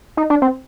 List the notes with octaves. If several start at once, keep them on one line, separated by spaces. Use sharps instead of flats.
D#4
D4
C4